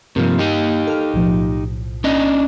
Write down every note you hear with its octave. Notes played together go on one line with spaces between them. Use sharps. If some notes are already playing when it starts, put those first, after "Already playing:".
G2 C3 F3 A#3
D#4 G4
A4 F6
B1 A2 F3
C#4 D4 D#5